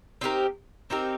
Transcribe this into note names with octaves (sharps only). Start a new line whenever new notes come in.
C4 D#4 G4 A#4
C4 D#4 G4 A#4